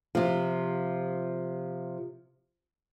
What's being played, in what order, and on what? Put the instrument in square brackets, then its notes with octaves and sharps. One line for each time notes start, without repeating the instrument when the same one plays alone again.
[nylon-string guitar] C3 F3